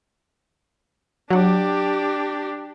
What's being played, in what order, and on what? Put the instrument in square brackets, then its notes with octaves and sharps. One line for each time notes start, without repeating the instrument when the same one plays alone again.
[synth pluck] F#3 F#5 [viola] D4 G4